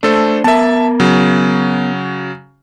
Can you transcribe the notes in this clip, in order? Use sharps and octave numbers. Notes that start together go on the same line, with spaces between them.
A3 D4 A4 C5
B3 A#4 E5 A5
C#3 F#3